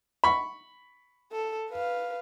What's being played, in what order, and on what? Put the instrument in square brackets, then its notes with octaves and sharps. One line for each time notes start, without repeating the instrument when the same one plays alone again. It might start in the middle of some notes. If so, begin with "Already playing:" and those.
[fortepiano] B5 C#6
[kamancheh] A4
B4 F5